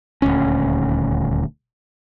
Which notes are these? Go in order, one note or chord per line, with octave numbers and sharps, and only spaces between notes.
D#1 D2 C#4